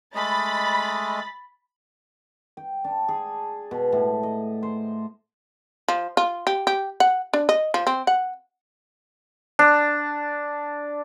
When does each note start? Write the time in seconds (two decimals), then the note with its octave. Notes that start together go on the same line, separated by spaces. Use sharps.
0.15 G#3 A3 D#5 B5 A6
2.57 G5
2.84 D4
3.08 G#4
3.71 B2
3.92 A2
4.23 D#5
4.63 C5
5.88 F3
6.17 F4
6.47 G4
6.67 G4
7.00 F#5
7.34 D4
7.49 D#5
7.74 F3
7.87 C4
8.07 F#5
9.59 D4